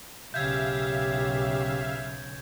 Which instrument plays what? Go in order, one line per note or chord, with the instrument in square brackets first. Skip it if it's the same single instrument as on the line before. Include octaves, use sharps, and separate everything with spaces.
[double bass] B1 C#3 [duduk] G4 [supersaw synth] E5 F5 [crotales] G6 G#6